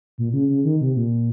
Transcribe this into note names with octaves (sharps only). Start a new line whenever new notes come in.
A#2
C#3
C#3
D#3
C3
A#2